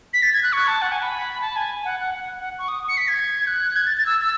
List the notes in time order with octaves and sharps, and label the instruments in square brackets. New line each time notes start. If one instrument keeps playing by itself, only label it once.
[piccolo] B6
A6
G#6
F#6
C#6
A5
F#5
G#5
B5
A5
G#5
F#5
F#5
F#5
F#5
C#6
D#6
C#7
B6
G#6
F#6
G#6
A6
A6
E6
E6